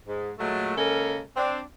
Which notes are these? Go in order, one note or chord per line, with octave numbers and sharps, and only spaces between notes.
G#2
A#2 F#3 G#3 A3
C#3 G#3 A#3 C#4 A4 A#4
C4 D4